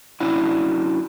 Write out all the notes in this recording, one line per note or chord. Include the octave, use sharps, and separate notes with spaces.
F#3 C#4 D4 E4 F#5